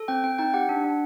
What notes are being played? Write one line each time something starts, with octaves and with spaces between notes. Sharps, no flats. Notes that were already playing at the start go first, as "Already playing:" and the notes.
Already playing: A4
C4 G5
C4 G5
D#4 G5
G4 F#5
D4
D4